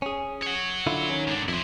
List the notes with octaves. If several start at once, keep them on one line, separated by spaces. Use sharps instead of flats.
C#4 G#4
C#5 F#5
D3 E4 F4
D#3 C#4
G#2 D4
F2 E4 C5